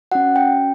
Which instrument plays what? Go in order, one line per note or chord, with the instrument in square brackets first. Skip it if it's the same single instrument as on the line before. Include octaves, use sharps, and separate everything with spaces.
[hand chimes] C#4 F#4 F#5
G5